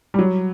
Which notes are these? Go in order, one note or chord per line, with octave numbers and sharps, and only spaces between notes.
G3
F#3